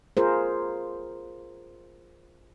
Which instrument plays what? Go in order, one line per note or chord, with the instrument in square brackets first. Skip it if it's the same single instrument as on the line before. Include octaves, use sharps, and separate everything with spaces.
[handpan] F4 G#4 A#4 C5